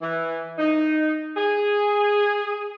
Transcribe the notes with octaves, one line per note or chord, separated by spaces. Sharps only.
E3
D#4
G#4